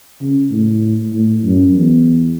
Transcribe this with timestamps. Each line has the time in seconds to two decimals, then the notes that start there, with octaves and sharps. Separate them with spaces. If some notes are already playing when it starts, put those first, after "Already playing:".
0.20 C#3
0.51 A2
1.13 A2
1.44 F#2
1.75 E2